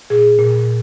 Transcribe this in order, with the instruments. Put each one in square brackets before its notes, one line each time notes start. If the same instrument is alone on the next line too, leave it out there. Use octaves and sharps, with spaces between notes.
[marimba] A#2 G#4
A#2